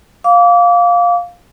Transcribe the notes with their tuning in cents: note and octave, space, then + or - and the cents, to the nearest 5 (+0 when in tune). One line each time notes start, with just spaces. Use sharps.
F5 +10 D6 -30